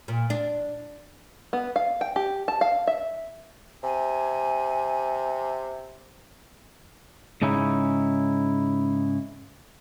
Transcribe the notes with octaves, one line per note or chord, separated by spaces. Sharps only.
A#2
D4
B3
F5
G5
G4
A5
F5
E5
C3 G#5
G#2 C#3 C#4 D#4 E4